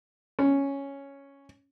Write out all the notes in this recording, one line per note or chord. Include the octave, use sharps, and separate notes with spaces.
C#4